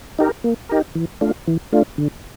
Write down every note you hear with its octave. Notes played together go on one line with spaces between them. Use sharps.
D#4 G4 A#4
A#3
D#4 G4 A#4
E3
A3 D4 F4
E3
A3 D4 F4
D3